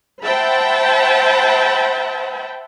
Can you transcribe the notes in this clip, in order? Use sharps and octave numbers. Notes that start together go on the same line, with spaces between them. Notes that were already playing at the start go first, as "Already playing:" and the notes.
C5 E5 F#5 G5 A5 B5